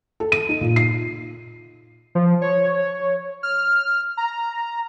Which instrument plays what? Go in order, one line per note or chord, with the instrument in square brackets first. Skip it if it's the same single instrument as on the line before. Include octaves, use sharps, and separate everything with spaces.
[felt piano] A4
D#7
D#4
A#2
C7
[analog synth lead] F3
C#5
F6
A#5